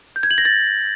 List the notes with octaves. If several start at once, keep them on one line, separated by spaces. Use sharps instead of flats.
G6
G#6
F#7
A#6
A6